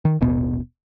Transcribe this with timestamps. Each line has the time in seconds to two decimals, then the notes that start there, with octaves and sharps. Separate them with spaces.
0.05 D#3
0.21 D#1 A1 B2 B3